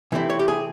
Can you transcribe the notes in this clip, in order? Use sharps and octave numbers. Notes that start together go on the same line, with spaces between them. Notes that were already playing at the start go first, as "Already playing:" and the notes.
C3 E3 A3 C4 E4
C#5
G4
G#4